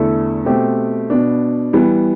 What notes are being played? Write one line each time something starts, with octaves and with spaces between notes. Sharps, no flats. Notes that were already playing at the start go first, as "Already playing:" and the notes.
Already playing: E2 D3 A3 E4 A4
B2 A3 C4 G4
B2 B3 D4
E3 G3 B3